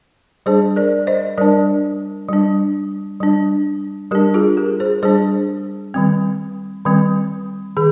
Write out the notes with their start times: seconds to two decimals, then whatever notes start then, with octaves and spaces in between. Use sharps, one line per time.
0.46 G3 D4 G#4 C5
0.76 A#4 D5
1.07 C5 D#5
1.38 G3 D4 A#4 D5
2.29 G3 D4
3.20 G3 D4
4.11 G3 D4 G4 A#4
4.34 F4 G#4
4.57 G4 A#4
4.80 G#4 C5
5.03 G3 D4 G#4 C5
5.94 D#3 G3 C4
6.85 D#3 G3 C4
7.77 D#3 G#4